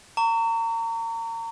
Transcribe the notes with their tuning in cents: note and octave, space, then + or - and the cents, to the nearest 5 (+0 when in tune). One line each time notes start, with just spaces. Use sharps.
A#5 -30 C#6 +35